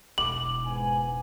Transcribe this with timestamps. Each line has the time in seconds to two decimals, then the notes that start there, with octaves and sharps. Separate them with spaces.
0.18 E1 E4 D6 F#7
0.66 G#2 B3 G#5